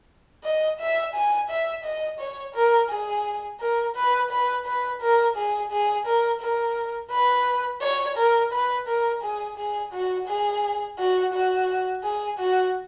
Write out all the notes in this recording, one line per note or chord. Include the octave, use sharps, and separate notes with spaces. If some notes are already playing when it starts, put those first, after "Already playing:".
D#5
E5
G#5
E5
D#5
C#5
A#4
G#4
A#4
B4
B4
B4
A#4
G#4
G#4
A#4
A#4
B4
C#5
A#4
B4
A#4
G#4
G#4
F#4
G#4
F#4
F#4
G#4
F#4